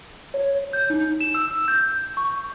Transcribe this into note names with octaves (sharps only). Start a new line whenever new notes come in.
C#5
G6
D#4
E7
E6
G6
C#6